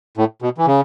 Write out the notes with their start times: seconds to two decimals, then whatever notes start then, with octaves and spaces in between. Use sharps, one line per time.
0.17 A2
0.42 B2
0.58 E3
0.66 C#3